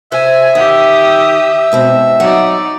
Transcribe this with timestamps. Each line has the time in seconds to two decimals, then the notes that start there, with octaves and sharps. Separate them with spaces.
0.12 C3 C5 E5 G#5
0.55 D#3 G4 D#6
1.72 G#2 B2 C4
2.20 F#3 D#4 D5 F#5